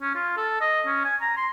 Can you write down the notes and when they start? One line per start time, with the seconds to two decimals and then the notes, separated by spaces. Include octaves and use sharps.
0.01 C#4
0.15 F4
0.37 A4
0.61 D#5
0.86 C#4
1.05 G#5
1.21 A#5
1.36 C6